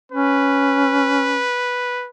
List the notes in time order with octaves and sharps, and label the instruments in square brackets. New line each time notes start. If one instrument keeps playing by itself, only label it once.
[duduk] C#4 [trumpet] B4